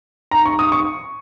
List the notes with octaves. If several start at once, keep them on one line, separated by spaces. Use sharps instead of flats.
A#5
C#6
D#6
C#6